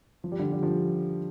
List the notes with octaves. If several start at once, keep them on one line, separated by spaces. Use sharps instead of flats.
F3
G3
D3 F3
G3
D3 F3